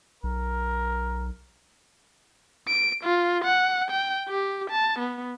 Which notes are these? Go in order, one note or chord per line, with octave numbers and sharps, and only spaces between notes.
B1 A#4
D7
F4
F#5
G5
G4
A5
B3